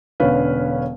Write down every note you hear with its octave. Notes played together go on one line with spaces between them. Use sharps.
E1 D3 C#4 B4 F5